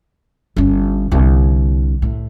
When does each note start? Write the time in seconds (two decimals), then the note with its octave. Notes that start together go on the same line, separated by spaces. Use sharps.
0.56 G1 C#4
1.11 C2 D3
2.02 A2